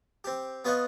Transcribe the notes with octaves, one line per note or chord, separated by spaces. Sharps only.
C4 G4
B3 F4 C#5 D#5 F#5